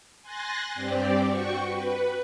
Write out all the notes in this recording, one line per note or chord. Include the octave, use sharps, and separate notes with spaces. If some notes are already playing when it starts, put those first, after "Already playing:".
G#5 C6 F#6 A6 A#6
G2 C4 G4 D5
F#4 G5 C#6
B4